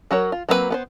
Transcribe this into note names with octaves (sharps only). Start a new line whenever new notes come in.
F#3 F#4 A#4 C#5
F4
F#3 A#3 C4 E4 B4
B3 B4 C5